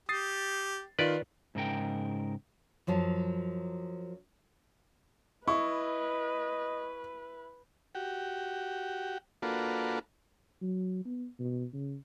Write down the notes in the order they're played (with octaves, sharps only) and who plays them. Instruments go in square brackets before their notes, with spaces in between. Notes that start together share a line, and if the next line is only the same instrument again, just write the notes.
[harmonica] G4 [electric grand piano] D#6 A6 C7
[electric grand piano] D#3 F4 [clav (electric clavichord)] B4 D5
[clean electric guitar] G#2 C#3 A#4 G5
[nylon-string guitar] F#2 F3 F#3 A5
[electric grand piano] E4 [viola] B4 [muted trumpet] D#5 [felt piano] C#6
[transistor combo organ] F#4 G4
A#3 D4 F4 F#4 A4 B4
[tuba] F#3
B3
B2
C#3